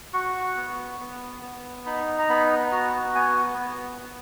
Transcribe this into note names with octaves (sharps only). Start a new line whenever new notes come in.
F#4 C#6
B3
B3
B3
D#4 B5
A#5
B3 B5
F#4 A#5
B3 G#5
B3
B3